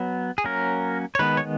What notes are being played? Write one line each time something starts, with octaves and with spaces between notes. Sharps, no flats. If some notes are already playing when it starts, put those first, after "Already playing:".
Already playing: F#3 B3
G#4
F#3 A#3 C#4 A#4
C#5
D#3 G#3 B3 B4
C#5